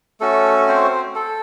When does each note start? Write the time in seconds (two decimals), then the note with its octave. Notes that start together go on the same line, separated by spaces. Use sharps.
0.20 A3 C#4 F#4 A4
0.68 C4 C5
1.15 A4